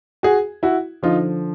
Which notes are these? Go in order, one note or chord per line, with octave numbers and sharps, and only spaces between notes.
F#4 G#4
E4 F#4
D3 F3 D#4 F4